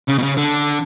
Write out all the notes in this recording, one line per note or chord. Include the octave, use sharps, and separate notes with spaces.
C#3
B2
C#3
D3